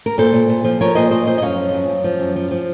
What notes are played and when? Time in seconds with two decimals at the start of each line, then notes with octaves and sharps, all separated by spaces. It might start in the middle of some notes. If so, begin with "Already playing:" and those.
0.06 A#4
0.18 A#2 A4 C5
0.33 A#2
0.49 A#2
0.64 F3
0.81 F3 A#4 C#5
0.95 A#2 C5 D#5
1.11 A#2 C5 D#5
1.26 A#2 C5 D#5
1.38 D#5
1.42 F#2 C#5 F5
1.58 F3
1.73 F#2
1.89 F#2
2.04 F3
2.20 F#2
2.36 F3
2.51 F3